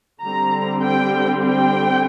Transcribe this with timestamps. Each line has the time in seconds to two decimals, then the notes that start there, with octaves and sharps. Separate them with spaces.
0.23 D3 G3 C4 A#5
0.83 G5
1.43 G5